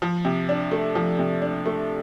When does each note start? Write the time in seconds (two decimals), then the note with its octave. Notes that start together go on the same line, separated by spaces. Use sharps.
0.02 F3
0.25 C3
0.49 D4
0.71 A3
0.95 F3
1.19 C3
1.42 D4
1.66 A3